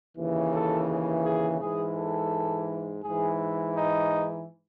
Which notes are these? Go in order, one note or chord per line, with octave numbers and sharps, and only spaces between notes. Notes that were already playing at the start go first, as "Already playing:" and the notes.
D#2 C#3 E3
A4
G#4
G#4
G#2 E3 G#4
A4
G#2 E3 G#4
D#4